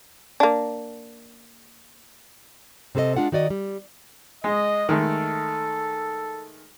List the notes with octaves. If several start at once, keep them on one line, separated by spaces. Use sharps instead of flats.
A#3 D4
C3 C4 A4 B4 D#5
G#3 D4 F4 F#5
D#3 F#4 D5 D#5
G3
G#3 D#5
D#3 G#3 A3 A4